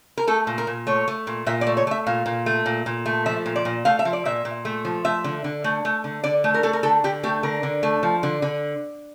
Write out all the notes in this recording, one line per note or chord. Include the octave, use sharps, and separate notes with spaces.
A#4
A3 A4
A#2
A#4
A#2
A3 C#5
A3
A#2
A#2 E5
D5
A3
C#5
A3 E5
A#2 F5
A#2
A3
A#2
A#2
A3
F3 E5
A#2
D5
A#2
A3 F5
E5
F3
D5
A#2 E5
A#2
A3
F3
A3 E5
D3
D3
A3
A3
D3
D3 D5
A3
A#4
A3 A4
A#4
D3 A4
D3 G4
A3 G4
D3 A#4
D3
A3
F3
D3
D3